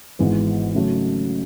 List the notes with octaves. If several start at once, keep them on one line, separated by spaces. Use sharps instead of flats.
G#1 G#2 E3 G#3 B3
C#3 F#3 A3